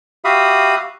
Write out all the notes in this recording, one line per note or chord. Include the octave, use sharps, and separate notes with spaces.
F#4 G4 E5 F5 B5 D#6